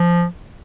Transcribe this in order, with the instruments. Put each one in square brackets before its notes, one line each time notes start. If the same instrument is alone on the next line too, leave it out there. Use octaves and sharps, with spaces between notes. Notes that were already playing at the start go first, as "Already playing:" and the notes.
Already playing: [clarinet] F3